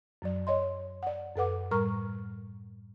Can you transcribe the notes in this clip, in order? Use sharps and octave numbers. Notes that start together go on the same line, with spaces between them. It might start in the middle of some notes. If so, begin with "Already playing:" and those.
F#2 F#3 D5
C#5 D#5 C6
D5 F#5
F#2 A4 B4 F#5 D6
A2 G3 A#4 A#5 C#6 F6